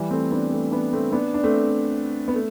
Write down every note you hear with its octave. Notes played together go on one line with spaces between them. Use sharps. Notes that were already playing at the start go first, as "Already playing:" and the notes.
Already playing: E3 G3
A3 C4
B3 D4
A3 C4
B3 D4
A3 C4
B3 D4
D4
A3 C4
B3
A3